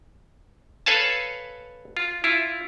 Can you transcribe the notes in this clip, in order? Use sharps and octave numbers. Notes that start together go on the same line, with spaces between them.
A4 B4 C#5 F5 G#5 A5
F4
E4 F4